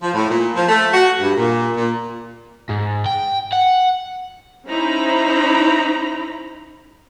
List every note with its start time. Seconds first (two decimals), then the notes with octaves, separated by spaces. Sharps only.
0.03 F3
0.14 A2
0.30 A#2
0.56 F3
0.69 A3
0.94 F#4
1.21 G2
1.36 A#2
1.77 A#2
2.69 G#2
3.06 G5
3.52 F#5
4.68 C#4 D#4 E4 C5 A#5 B5